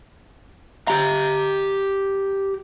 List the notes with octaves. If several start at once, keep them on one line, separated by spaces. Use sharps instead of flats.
G4 A#5